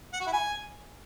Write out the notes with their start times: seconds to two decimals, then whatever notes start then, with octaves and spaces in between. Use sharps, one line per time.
0.13 F#5
0.20 F#4
0.26 E4
0.33 G#5